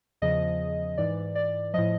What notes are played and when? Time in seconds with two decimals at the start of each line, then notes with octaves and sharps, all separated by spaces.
0.22 E2 C#3 F3 D#5
0.98 G#2 E3 D5
1.35 D5
1.74 A2 F3 D#5